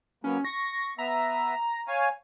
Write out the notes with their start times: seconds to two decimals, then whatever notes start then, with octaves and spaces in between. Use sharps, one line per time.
0.24 F#3 A#3 B3 C#4
0.45 C#6 A#6
0.99 B3 E5 A#5
1.88 C#5 F5 G#5